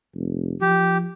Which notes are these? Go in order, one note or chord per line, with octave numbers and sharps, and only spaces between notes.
F1
F3 G4